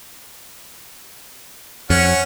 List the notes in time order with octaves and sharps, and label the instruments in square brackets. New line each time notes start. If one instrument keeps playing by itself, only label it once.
[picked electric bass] F2 [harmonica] C#4 F#5